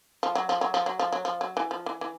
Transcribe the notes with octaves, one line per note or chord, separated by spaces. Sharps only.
F3
F#3
F3
F#3
F3
F#3
F3
F#3
F3
F#3
E3
F3
E3
E3